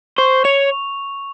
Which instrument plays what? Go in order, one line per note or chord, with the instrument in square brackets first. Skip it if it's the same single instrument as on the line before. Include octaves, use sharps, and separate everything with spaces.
[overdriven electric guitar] C5 [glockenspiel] C#6
[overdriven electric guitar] C#5 [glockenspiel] F7